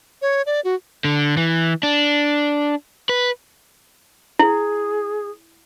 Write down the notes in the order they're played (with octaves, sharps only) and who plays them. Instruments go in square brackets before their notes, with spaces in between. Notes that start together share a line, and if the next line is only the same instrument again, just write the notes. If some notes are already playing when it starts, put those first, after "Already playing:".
[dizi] C#5
D5
F#4
[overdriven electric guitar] D3
E3
D4
B4
[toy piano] E4 [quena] G#4